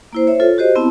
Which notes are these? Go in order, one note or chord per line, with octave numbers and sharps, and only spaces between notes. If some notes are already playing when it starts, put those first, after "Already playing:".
A#3 E4 C5
C5 C#5 E5
F4 A4 C#5
F#4 G4 C5 D#5
B3 C4 E4 A5